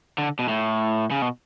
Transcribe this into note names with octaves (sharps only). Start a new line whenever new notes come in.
D3
B2
A2
C#3
B2